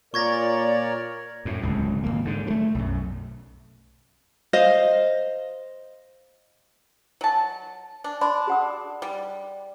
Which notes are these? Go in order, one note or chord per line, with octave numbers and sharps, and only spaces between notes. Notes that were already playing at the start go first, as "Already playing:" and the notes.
A#2 A#4 C#5 D5 C#6 G#6 A#6
F#2 A2
D1 C#2 G2
G#1 C#2 A#3
G#2 D3
F#3 A3
B1 F#2
C5 D#5 F5
F#3 A5
D4
D4 D5 B5 C6
G#4 F#5 D#6
G3